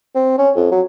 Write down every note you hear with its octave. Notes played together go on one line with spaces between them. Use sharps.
C4
C#4
F2
F#3